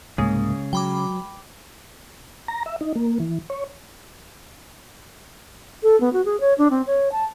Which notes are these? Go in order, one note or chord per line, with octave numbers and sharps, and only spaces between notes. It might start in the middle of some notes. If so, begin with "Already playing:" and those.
C2 G#2 C#3 G#3 A#3 C#4 G#4
F#3 G5 B5 D6
A#5
E5
D#4
A#3
E3
C#5
A4
B3
F#4
G#4
C#5
D4
C4
C#5
A5